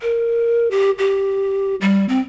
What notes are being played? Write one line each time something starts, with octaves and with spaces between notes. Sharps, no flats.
A#4
G4
G4
G3
C4